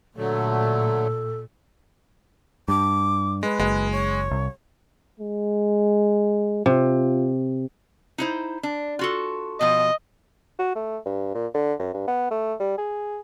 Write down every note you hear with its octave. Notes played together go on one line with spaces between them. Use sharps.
A#2 D3 F#3 A3 A4
G2 D6
G#3 B4
F#1 G#3
C#5
C2
G#3
C3 F4
D#4 E4 C5
D4
F4 F#4 A4
B2 F3 D#5
F#4
A3
G2
A#2
D3
F#2
G2
B3
A3
G3
G#4